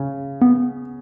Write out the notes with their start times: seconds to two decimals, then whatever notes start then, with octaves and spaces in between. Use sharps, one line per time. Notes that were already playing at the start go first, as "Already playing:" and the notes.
Already playing: C#3
0.42 B3